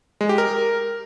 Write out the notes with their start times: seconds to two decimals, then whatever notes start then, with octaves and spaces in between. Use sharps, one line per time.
0.21 G#3
0.29 G4
0.38 A#4